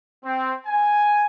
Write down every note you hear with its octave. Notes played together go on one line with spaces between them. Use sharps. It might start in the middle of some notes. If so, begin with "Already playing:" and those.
C4
G#5